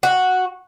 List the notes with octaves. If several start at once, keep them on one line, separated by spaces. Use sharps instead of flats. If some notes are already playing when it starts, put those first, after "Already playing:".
F#4